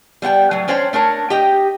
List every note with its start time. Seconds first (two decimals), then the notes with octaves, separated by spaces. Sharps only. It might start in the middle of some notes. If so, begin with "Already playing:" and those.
0.22 G3 B3 F#5 G5
0.51 A2 F#3
0.68 C#4 D4 C5 C#5 G5
0.93 A3 D4 A#4 C#5
1.30 G4 D#5 G5